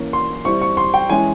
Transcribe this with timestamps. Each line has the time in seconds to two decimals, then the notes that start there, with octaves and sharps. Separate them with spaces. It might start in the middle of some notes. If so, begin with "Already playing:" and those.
Already playing: E3 A#3 C#4
0.13 C6
0.45 G3 C4 E4 C#6
0.62 C#6
0.77 C6
0.94 G5
1.10 E3 G#3 C#4 E4 G#5